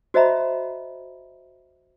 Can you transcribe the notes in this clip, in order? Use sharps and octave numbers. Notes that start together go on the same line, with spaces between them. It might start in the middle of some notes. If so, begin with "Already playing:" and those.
F#4 C5 D#5 E5 A#5 B5